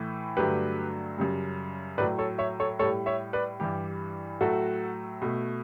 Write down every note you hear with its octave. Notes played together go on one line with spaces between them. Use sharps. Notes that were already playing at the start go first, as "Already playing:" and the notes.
Already playing: A2 E3 A3
G2 D3 F#3 A3 G4 B4
F#2 C#3 G3
A2 F#3 A3 B4 D5
A4 C#5
C#5 E5
A4 C#5
A2 G3 A4 C#5
C#5 E5
B4 D5
G2 E3 G3 G4
A2 F#3 A3 F#4 A4
B2 A3